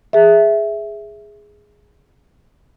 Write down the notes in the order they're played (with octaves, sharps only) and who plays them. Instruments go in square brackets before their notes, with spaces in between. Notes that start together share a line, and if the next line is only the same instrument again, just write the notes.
[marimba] G#4 E5